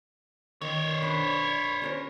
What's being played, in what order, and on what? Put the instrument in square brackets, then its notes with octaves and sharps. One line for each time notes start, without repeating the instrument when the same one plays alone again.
[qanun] D#3 [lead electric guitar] C5 C#5
[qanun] D4 [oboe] B5
[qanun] C#4 A#4 B4